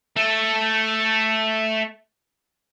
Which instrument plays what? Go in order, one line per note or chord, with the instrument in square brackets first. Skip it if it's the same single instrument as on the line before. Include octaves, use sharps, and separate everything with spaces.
[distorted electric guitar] A3 A4